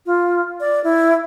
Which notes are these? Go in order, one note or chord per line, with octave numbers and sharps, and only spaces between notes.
F4
D5
E4